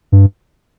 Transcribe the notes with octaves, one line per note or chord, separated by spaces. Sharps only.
G2